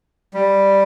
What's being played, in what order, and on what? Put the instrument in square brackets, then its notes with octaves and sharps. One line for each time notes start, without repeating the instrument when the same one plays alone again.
[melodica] G3